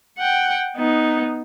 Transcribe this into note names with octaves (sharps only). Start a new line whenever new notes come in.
F#5 G5
B3 D#4